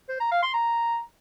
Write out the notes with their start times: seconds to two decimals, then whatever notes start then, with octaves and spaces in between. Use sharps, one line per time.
0.09 C5
0.20 A#5
0.31 F5
0.42 C6
0.54 A#5